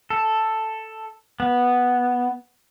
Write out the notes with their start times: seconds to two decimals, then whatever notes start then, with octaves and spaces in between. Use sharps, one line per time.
0.10 A4
1.40 B3